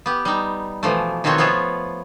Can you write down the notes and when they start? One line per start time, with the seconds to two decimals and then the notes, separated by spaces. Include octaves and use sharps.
0.06 B3 G4
0.25 G3 D#4
0.83 B2 E3 F3 A3
1.24 B2 D#3 F3 C4 F#4 C#5
1.38 F3 B3 F4 C#5 E5